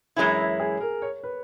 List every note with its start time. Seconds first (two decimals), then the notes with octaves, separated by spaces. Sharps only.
0.16 F#2 E3 G#3 C#4 E4 G#4
0.60 G#4
0.80 A#4
1.02 C#5
1.23 B4